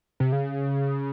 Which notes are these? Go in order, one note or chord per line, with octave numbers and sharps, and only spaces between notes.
C3
C#3